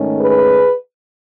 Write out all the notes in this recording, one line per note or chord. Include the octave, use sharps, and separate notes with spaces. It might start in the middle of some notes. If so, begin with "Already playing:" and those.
Already playing: G#2 D#3 A3 C#4
G#4 B4